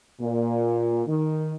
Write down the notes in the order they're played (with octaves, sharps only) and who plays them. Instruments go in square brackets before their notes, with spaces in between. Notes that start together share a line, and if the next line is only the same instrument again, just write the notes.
[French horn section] A#2
D#3